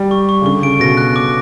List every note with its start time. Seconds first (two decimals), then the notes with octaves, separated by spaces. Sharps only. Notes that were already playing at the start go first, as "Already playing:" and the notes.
Already playing: G3
0.11 C#6
0.29 C#6
0.41 C#3
0.45 D3 C#6
0.62 C#3 D7
0.80 B2 A#6
0.97 F#6
1.16 D6